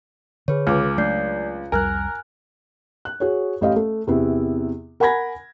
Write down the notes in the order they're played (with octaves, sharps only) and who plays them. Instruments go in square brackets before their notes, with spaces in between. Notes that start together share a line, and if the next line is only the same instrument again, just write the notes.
[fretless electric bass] D3 [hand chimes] G#4 B4 C#5
[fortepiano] C#2 [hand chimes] D6 F6
[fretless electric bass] F#3 A3 D4 [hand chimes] D5 G6 C7
[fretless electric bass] C2 F2 G3 [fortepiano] A#4 [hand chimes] G#5 F6 F#6
[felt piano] F#6
F#4 G#4 C#5
A1 G4 D#5 F5
A3
E2 C3 B3 E4
A#4 F#5 G#5 B5 G#6 A#6